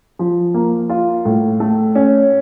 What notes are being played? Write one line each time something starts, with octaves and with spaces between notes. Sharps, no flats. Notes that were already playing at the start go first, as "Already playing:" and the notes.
F3
A#3
F4
A2
A3
C#4